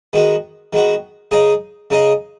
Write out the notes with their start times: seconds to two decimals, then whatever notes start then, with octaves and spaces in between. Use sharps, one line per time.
0.13 D#3 G#3 B3 F#4
0.73 D#3 G#3 B3 F#4
1.31 C#3 G#3 D#4 G#4 D#5
1.90 C#3 G#3 D#4 G#4 D#5